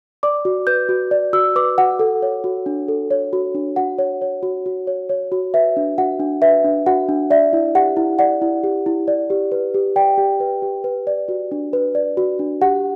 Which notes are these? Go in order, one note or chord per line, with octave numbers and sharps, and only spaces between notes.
D5 D6
F#4
B4 G6
F#4
D5
F#4 E6
B4 D6
F#4 F#5
A4
C#5
F#4
D4
A4
C#5
F#4
D4
F#4 F#5
C#5
C#5
F#4
F#4
C#5
C#5
F#4
B4 E5
D4
F#4 F#5
D4
B4 E5
D4
F#4 F#5
D4
D5 E5
E4
G4 F#5
E4
D5 F#5
E4
G4
E4
D5
G4
B4
G4
D5 G5
G4
B4
G4
B4
D5
F#4
D4
B4
D5
F#4
D4
G4 F#5